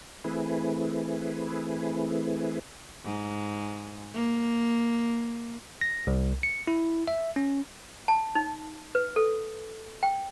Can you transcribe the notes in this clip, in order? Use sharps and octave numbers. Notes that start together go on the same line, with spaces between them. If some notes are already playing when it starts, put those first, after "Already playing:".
E3 A3 C4 E4 G#4 B4
G#2
A#3
A#6
C2
C#7
E4
E5
C#4
A5
D#4
B4
A4
G5